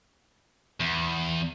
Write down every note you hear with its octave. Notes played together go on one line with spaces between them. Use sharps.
E2